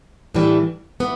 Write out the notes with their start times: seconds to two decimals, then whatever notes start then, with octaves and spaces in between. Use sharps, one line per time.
0.34 A2 E3 G3 D4
1.00 E3 B3